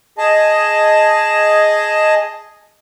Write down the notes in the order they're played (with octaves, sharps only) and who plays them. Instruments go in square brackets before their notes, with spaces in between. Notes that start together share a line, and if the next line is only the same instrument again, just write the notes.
[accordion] G#4 D#5 A5